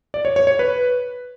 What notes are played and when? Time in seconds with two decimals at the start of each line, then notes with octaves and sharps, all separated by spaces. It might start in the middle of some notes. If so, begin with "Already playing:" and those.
0.14 D5
0.25 C#5
0.36 C#5
0.47 C#5
0.59 B4